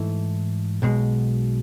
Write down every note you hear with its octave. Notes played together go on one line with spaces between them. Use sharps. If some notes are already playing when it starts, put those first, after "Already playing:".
Already playing: G#2 E3 A3 E4 A4
B1 B2 G#3